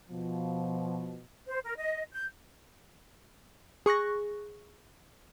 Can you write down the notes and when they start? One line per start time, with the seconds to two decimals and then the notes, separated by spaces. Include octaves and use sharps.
0.10 B2 F3
1.47 C5
1.64 A#4
1.77 D#5
2.12 G6
3.86 G#4 C#6 F#6 A#6